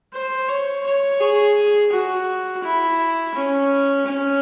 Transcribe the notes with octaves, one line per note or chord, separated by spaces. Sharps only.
C5
C#5
C#5
G#4
F#4
E4
C#4
C#4